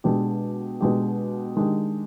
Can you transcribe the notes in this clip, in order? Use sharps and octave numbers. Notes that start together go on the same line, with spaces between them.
B2 G#3 D4 G4
B2 G#3 D4 G4
D#3 G#3 D4 G4